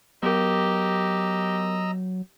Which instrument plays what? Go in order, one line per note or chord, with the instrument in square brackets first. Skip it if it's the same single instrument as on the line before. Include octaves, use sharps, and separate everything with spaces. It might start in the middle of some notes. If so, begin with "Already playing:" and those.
[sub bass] F#3 [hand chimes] B3 A#4 [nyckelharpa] G4 [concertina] D#5 A#5 E6